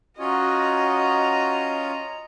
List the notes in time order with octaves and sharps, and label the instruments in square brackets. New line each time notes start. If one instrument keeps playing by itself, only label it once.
[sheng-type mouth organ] C#4 F4 C#5 [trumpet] F#4 [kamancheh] D#5 A#5